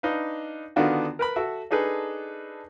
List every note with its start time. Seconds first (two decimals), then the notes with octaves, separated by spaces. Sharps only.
0.03 D4 D#4 B4 F5
0.76 D3 D#3 B3 D4 F4 F#4
1.19 A#4 B4 B5
1.36 F#4 A4 E5 F#5
1.71 D4 D#4 G#4 A4 B4